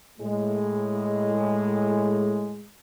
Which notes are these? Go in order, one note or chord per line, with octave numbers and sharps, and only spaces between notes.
A2 G#3